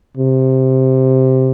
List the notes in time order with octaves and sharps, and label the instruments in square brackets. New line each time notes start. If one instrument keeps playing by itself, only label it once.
[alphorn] C3